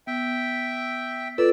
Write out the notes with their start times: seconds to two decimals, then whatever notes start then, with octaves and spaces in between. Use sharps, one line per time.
0.07 B3 E5 G5
1.38 F4 A4 B4 D5 E6